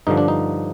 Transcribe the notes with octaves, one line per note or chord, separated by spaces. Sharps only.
G2 D3 F3 D#4
D4
D#4